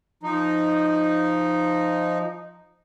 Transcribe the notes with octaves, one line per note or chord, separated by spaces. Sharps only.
F3 D#4